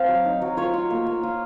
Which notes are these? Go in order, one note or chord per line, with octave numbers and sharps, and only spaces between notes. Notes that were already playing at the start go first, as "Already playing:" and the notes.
Already playing: C4 F5
F#3
D#4
F#3
F4 C#5
F4
A#3
A#3
F4